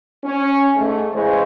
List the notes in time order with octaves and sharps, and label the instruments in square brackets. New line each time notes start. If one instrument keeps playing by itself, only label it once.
[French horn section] C#4
G#2 A3
C#3 E3 G#3 G#4 C5 C#5